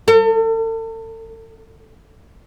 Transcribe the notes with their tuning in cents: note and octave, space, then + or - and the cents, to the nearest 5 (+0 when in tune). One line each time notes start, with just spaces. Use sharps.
A4 +40